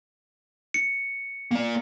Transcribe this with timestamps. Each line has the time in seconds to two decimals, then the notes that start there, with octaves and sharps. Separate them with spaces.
0.74 C#7
1.51 A#3 D5